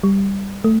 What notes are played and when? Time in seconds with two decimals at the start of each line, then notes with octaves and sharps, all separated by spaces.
0.03 G3
0.64 A3